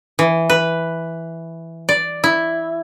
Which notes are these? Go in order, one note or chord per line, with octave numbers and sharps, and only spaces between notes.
E3
B4
D5
E4